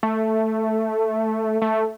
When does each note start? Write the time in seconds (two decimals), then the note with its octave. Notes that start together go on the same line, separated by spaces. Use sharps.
0.03 A3
1.62 A3